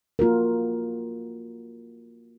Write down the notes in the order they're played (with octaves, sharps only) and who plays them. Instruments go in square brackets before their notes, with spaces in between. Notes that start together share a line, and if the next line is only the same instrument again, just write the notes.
[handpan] A#3 F4 F#4 A#4